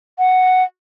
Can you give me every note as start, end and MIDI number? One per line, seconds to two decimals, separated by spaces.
0.18 0.64 78